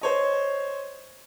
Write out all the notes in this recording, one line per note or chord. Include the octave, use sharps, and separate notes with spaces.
C5 C#5 D#5